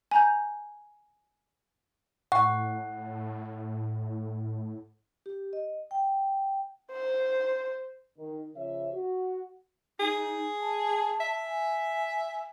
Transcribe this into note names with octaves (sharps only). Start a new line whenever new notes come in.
G#5 A#5 G6
A2 F#5 C#6
G4
D#5
G5
C5
D#3
C#3 F3 C#5 E5
F#4
D#4 G#4
A5
E5
G#5